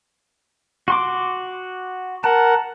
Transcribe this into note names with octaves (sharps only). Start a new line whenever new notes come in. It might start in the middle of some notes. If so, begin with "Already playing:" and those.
F#4 C6 D6
A#4 F#5 A5